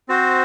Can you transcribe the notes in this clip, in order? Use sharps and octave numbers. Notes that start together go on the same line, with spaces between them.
C4 F#4 C5